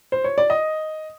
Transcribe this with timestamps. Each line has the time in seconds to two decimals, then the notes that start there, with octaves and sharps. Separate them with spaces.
0.12 C5
0.24 C#5
0.38 D5
0.50 D#5